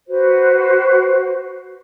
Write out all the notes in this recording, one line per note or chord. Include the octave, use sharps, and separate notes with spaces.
F#4 B4 C5